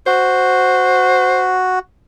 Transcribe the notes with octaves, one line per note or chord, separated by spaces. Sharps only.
F#4 C5